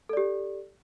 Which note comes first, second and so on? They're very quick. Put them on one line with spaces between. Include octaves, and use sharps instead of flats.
A4 D5 G4